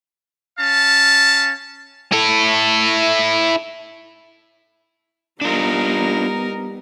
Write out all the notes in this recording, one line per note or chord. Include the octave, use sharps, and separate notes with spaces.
C#4 F5 A5
E4 A4
G3 B3 D4 D#4 F4 A#4